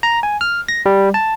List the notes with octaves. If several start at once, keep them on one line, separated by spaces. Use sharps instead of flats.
A#5
G#5
F6
A#6
G3
A5